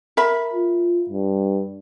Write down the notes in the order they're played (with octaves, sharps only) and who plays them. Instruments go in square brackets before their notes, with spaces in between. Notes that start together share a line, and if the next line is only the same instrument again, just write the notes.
[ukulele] A#4 E5 B5
[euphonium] F4
G2